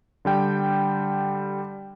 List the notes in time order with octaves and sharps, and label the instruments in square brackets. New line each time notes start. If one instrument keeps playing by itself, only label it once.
[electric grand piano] D3 G3 G5